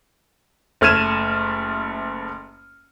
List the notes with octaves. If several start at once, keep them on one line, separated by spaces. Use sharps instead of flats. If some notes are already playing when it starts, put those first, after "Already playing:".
F#1 A3 F6 G#6 D#7 E7